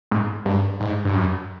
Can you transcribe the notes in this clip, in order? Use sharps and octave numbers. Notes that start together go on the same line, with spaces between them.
G#2
G2
G#2
G2
F#2